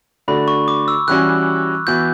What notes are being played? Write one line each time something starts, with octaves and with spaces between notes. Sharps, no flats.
D3 A3 D4 F#4 B5
C#6
D6
E6
E3 G3 C#4 F#4 F#6
E3 B3 F#4 G6